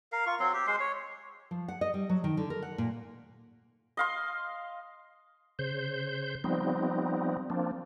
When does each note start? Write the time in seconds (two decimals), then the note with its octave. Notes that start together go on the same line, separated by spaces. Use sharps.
0.12 A#4 F5
0.26 F4 C#6
0.40 F#3 C4 C6
0.53 G4
0.67 G#3 C5 C6
0.80 C#5
1.51 F3
1.68 F#5
1.81 D#5
1.94 G3
2.10 F#3
2.24 D#3
2.37 D3
2.50 A#4
2.62 F#5
2.78 A#2
3.97 D#5 F5 C6
5.59 C#3 C5 G6
6.44 F3 G3 B3 C4 D#4
7.50 F3 A#3 C4 D4